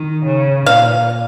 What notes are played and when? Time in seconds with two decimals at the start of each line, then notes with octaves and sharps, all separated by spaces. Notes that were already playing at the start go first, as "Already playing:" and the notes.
Already playing: D#3
0.25 C#3
0.66 A#2 F5